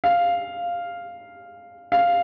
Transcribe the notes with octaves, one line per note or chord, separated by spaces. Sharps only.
F5
F5